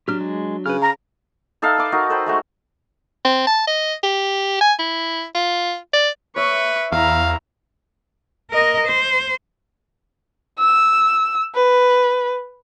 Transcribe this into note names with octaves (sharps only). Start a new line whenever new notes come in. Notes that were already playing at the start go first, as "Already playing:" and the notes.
F#3 D4 G4 F6
G#3
C#3 B4 F6
F5 A#5 F6
D#4 A4 E5 F5
B4 D6
D#4 F#4 A#4
A4 B4 C5 G5
G#3 A3 F#4
C4
A5
D#5
G4
G#5
E4
F4
D5
B4 C#5 E5 C#6
E2 E4 F5 A#5
A#4 D#5
C5
E6
B4